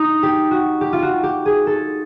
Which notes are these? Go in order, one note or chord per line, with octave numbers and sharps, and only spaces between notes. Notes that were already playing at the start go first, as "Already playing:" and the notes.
Already playing: D#4
G4
F#4
G4
F4
F#4
G4
G#4
A4